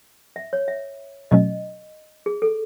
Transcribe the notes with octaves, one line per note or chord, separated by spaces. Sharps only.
E5
C#5
E5
B2 F#3 A3 C#4 D#5
G#4
A4